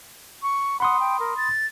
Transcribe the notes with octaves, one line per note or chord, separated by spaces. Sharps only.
C#6
F#5 B5 C6 D#6
G5
A#4
A6